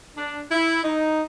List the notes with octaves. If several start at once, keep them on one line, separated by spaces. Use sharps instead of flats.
D4
E4
D#4